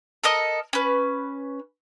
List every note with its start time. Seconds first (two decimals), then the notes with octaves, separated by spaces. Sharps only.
0.23 A4 A#4 D#5 D#6
0.73 C#4 B4